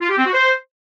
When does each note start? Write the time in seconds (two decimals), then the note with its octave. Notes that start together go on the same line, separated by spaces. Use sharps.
0.01 F4
0.09 G4
0.17 C4
0.25 F#4
0.34 C5